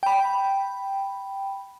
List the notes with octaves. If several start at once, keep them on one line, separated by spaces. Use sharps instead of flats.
G5 B5